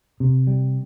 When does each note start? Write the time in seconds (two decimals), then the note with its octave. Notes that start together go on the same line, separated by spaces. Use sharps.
0.20 C3
0.47 G3